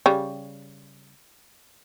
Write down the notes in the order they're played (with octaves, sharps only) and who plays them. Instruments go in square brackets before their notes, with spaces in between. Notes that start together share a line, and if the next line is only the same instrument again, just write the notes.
[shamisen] C#3 G3